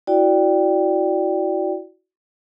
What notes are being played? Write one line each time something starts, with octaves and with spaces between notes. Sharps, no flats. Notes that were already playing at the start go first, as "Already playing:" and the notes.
E4 F#4 D5 G5